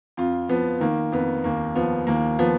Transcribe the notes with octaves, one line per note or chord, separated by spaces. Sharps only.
F2 F4
F3 B3
D#3 A#3
F2 B3
D#2 A#3
F3 B3
D#2 A#3
F3 B3